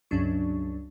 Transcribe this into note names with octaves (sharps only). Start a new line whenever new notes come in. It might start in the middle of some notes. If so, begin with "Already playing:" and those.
C#2 G2 F#3 C#4 D4 C#6